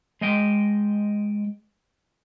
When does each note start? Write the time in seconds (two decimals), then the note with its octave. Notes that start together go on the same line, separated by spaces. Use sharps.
0.21 G#3 D#5 G5